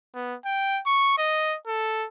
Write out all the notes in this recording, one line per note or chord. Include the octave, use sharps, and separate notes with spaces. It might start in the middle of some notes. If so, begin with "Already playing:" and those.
B3
G5
C#6
D#5
A4